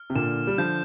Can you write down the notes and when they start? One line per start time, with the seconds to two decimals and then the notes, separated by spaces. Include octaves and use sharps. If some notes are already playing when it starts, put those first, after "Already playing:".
Already playing: F6
0.10 C3
0.15 A#2 D3 E7
0.47 G3
0.58 D3 F3 G6